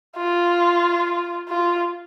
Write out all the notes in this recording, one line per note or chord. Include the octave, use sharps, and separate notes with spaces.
F4
F4